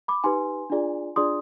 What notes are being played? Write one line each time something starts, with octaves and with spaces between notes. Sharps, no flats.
B5 D6
D#4 G4 B4 G#5 C6
D4 F4 G#4 D5
D4 F4 G#4 D5 C6 D#6